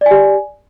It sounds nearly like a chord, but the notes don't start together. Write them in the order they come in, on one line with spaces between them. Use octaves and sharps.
D5 G#5 G4